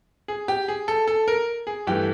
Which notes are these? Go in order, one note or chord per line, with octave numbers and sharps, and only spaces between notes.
G#4
G4
G#4
A4
A4
A#4
G#4
G2 E3 A3 G4